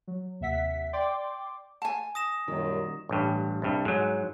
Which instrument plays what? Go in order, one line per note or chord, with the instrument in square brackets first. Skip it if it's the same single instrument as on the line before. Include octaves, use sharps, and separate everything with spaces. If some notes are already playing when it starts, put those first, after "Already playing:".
[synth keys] F#3
D#2 C3 E5 F#5 B6
D5 G5 C6 D6
[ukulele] G#5 A5
[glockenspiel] D#6 A#6 E7
[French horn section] F#2 A#2 G3 [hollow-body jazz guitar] D#3
[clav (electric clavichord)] A1 G2
C2 G2
G#2 F#3